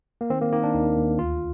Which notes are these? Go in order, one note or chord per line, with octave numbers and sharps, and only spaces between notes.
A#3
D#3 C4
A#3
D#3 A#3
D4
D#2 D#4
D#2
D2 F4